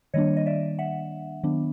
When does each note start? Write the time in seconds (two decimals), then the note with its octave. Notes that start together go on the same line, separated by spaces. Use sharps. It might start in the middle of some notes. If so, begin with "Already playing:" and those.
0.14 D#3 G3 A#3 D4 C#5 D#5
0.37 D#5
0.46 D5 E5
0.79 E5 F#5
1.43 D#3 F#3 B3 D4